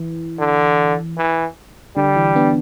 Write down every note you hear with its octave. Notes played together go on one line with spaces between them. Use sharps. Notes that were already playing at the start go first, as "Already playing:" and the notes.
Already playing: E3
D3
E3
D3 G3
E3
B3 D4